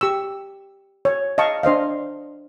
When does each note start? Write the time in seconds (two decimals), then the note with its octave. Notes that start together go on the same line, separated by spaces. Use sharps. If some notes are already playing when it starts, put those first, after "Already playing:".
0.01 G4 C#6 E6
1.05 C#5
1.38 D#5 F5 A5 C#6
1.63 D4 C5 D#5 F5